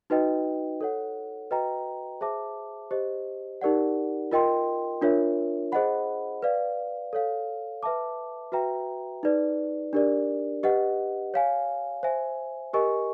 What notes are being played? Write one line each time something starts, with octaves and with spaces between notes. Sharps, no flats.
D#4 F#4 B4 D#5 G5
A4 C#5 F#5
F#4 B4 D#5 G5 A#5
G#4 C5 E5 A5 D6
G4 C5 D#5
D#4 G4 A#4 D5 F#5
F4 A#4 D#5 G5 C6
D4 F4 A#4 C#5 E5
G#4 C5 D#5 F#5 B5
B4 D5 F5
A4 C#5 F5
B4 E5 A5 D6
F#4 B4 E5 G5 A#5
D#4 G#4 B4 D5
D4 G4 A#4 D5
G4 B4 D#5 F#5
C#5 F5 G#5
C5 E5 G#5
G4 A#4 D#5 G#5 C#6